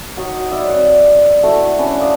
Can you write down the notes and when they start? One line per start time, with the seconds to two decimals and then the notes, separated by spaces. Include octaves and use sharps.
0.17 F#3 D#4 C#5
0.51 B4 D5 E5
0.67 C4 D5 F#5
1.43 A3 E4 F#4 A4
1.79 C#4 D4 B4
1.99 E5 F5 D6 D#6